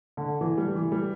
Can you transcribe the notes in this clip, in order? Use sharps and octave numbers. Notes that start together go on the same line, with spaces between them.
D3
E3
G3
E3
G3